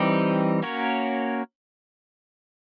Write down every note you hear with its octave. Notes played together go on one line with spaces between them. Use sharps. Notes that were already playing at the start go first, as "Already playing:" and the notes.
Already playing: E3 G3 C4 D#4 G4
A#3 C#4 F#4 A#4 C#5